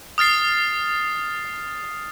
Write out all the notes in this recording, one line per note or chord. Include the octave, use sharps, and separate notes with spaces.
D#6 F6 A6 C7